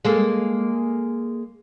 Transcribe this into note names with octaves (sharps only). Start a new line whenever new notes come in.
G#3 A#3 A4